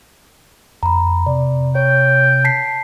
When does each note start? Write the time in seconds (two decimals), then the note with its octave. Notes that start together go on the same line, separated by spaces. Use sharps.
0.83 F2 A#5 B5
1.26 C3 D5
1.75 C#5 G5
2.44 A5 B6 C7